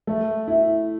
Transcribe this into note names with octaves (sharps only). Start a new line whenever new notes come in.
A3
E4